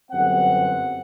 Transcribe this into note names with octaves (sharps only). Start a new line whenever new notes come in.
G1 F#2 C4 F#5